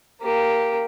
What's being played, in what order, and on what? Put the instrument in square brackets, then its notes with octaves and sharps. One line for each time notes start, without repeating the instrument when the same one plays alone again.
[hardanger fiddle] A#3 G4